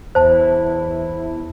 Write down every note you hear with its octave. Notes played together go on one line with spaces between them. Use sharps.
E2 E4 C5 A5